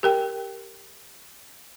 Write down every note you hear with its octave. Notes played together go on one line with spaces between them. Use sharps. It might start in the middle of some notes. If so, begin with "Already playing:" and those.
G4 A#4 G5